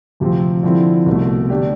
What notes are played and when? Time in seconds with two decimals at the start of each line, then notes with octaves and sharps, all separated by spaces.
0.20 D2 C3 F3 C4
0.63 D3 F3 C4 E4 A4
1.06 C2 B2 A3
1.50 D3 A3 D4 G4